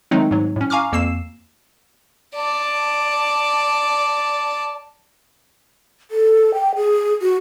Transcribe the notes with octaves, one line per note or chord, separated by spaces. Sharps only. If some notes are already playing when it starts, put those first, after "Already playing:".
D#3 F#3 G#3 A3 C4 D#4
G#2 F#3
A2 C#4
F5 G#5 A#5 C#6 D6 F6
F2 A#3 E6 C7 E7
D5 A5
A4
G5
G#4
F#4